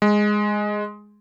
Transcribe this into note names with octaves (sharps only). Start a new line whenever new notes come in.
G#3